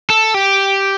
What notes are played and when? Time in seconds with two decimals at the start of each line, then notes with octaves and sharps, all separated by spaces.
0.10 A4
0.34 G4